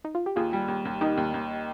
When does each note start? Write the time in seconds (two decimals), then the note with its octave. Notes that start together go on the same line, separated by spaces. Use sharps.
0.05 D#4
0.15 F4
0.26 G4
0.36 D#2 F4 G#4
0.53 G3
0.68 D#2
0.85 D#2
1.01 D#3 D#4 G4
1.17 D#2
1.34 D#2